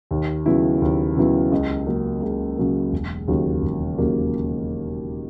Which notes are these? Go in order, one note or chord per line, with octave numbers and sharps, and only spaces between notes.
D#2
C#3 F#3 B3 E4
D#2
C#3 F#3 B3 E4
C#2
C#3 F#3 A#3
C#2
C#3 F#3 A#3
E1
D#2 C#3 F#3 A#3
E1
D#2 C#3 F#3 A#3